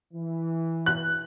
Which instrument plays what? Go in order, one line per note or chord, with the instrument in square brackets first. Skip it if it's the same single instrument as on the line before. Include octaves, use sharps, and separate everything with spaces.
[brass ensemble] E3
[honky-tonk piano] F#6